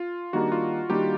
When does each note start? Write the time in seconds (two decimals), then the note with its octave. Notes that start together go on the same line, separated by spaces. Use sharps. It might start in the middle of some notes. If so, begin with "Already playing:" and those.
Already playing: F4
0.33 D#3 G3 A#3 D4 F#4
0.52 F4
0.90 D#3 G3 A#3 D4 G4